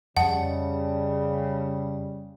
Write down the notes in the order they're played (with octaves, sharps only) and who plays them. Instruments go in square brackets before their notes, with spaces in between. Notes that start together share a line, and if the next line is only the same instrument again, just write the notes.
[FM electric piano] F2 D#5 A5 [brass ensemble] C#3 G3 [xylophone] F#5